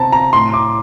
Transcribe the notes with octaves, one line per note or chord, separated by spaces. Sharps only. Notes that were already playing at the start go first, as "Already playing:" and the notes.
Already playing: C3 C4 A5 A#5
A#5
A2 C6
D6